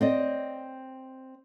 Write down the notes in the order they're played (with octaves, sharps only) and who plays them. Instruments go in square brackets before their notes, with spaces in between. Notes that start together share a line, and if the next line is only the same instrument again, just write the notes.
[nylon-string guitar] C4 D5 D#5